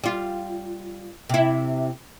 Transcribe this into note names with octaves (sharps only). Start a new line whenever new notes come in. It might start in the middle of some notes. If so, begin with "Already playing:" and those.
G3 F4
C3 E4